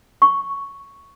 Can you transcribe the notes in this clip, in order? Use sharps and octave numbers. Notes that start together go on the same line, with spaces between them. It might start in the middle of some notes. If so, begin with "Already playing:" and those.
C#6